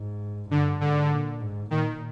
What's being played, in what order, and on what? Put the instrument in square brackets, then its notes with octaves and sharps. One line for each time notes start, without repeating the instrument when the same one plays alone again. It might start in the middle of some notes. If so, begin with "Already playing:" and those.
Already playing: [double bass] G#2
[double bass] G2 [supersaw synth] D3
[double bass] G#2 [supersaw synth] D3
[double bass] A#2
G#2
[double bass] A#2 [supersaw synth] D#3